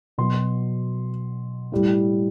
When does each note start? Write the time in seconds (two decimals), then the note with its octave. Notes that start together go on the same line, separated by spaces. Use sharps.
0.18 B2 F#3 C6
1.72 A2 G3